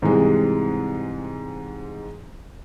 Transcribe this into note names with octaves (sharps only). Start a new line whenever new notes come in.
G#2 C3 E3 G3 G#3